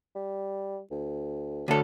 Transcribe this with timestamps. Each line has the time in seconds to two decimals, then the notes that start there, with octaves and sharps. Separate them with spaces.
0.15 G3
0.91 D2
1.68 D2 F#3 A4